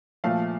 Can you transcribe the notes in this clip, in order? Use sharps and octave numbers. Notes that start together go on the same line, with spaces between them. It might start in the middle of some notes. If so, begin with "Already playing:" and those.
A#2 F3 A3 F5